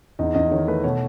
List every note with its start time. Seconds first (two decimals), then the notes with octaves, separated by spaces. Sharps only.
0.19 E2 D#4 D#5
0.35 E2 D#4 D#5
0.51 D#3 C#5
0.68 A3 B4
0.84 B2 C#5